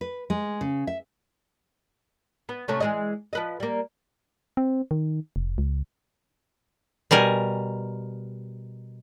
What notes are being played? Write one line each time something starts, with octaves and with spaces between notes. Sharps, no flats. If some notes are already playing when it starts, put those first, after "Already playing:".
B4
G#3
C#3
E5
B3
C3 A3 C#4
E3 G#3 D#5
F3 B4 D#5
G3 A#3
C4
D#3
F1
C#2
B2 G3 A#4 G#5